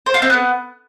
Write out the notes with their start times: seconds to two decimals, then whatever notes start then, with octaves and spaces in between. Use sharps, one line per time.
0.06 C5
0.14 F4
0.22 C4
0.30 B3